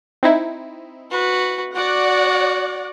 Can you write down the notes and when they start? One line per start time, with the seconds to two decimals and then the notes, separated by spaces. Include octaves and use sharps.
0.23 C4 D#4 E4
1.11 F#4 B4
1.75 F#4 D5 F#5